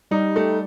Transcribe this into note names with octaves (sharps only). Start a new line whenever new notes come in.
G3 D#4
A3